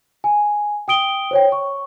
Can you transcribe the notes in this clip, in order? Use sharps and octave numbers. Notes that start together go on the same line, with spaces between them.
G#5
G5 D#6 D7 G7
C5 C#5 G5
C#6